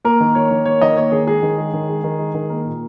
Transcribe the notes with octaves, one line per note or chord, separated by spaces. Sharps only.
A#3 A#4
D#3
A#3 C#5
D#3
A#3 C#5
D#3 D#5
A#3 C#5
D#3 G#4
G#3 G#4
D#3
G#3
D#3
G#3
D#3
G#3
D#3
A#3 A#4
A#2